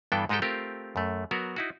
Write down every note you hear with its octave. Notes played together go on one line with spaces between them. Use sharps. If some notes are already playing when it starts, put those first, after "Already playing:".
G2 E3 B3 D4 A4 G5
G#2 G#3 D#4 G4 A4 G5
A3 C4 F4 G4 A#4
F#2 A3
F#3 B3 F#4 A#4
D#4 E4 F#4